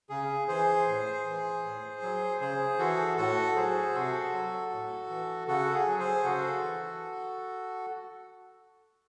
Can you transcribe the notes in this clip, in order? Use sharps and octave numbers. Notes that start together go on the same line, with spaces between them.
C#3 G#4
E3 G#4 C5
A2
E3
A2
F#3
C#3 G#4 C5
E3 F#4 A4
A2 F#4 A4
F#3 G#4 C5
C3 F#4 A4
F#3
A2
E3
C#3 F#4 A4
G#4
F#3
G#4 C5
C#3 F#4 A4
E3